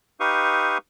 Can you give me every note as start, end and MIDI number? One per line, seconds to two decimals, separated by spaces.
0.20 0.78 63
0.20 0.78 67
0.20 0.78 71
0.20 0.78 77
0.20 0.78 85
0.20 0.78 87